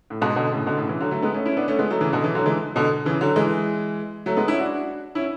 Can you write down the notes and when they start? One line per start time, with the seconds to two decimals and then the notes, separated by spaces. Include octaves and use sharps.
0.10 A2
0.22 G#2 B2
0.36 B2 D3
0.51 A2 C#3
0.66 B2 D3
0.78 A2 C#3
0.89 C#3 E3
1.01 D3 F#3
1.11 F#3 A3
1.22 G#3 B3
1.34 A3 C#4
1.45 C#4 E4
1.57 B3 D4
1.68 A3 C#4
1.79 G#3 B3
1.90 F#3 A3
2.01 C#3 E3
2.12 B2 D3
2.24 C#3 E3
2.35 D3 F#3
2.46 E3 G#3
2.76 B2 D3
3.06 C#3 E3
3.21 D3 F#3
3.36 E3 G#3
4.26 F#3 A3
4.37 G#3 B3
4.48 C#4 E4
4.59 D4 F#4
5.15 C#4 E4